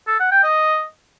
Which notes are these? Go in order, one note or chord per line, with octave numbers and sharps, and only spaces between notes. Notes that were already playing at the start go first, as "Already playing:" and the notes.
A4
F#5
G5
D#5